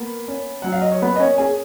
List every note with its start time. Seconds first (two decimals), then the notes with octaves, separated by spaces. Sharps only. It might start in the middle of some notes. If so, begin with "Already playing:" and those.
Already playing: A#3 B3
0.28 C#4
0.62 F#3 F#5
0.73 F5
0.82 D#5
0.92 C#5
1.02 A#3 B3 B4
1.16 D#5
1.20 C#4 C#5
1.38 C#4 G#4 G#5